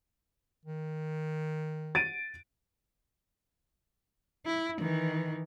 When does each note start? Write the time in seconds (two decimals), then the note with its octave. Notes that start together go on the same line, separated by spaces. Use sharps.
0.65 D#3
1.95 A6 D7 D#7
4.46 E4
4.80 D#3 E3